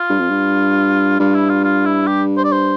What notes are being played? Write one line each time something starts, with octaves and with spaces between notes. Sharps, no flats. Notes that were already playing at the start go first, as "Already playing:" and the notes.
Already playing: F4
G2
F2
G2
G2 F4
E4
F4
F4
E4
G4
C5
D5
C5